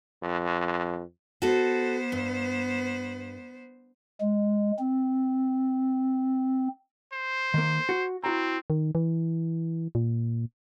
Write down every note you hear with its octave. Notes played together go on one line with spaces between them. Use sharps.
F2
B3 F#4 A4 C5
G2
G#3
C4
C5
D#3 A#3
F#4
C4 E4 F#4 A#5
D#3
E3
A#2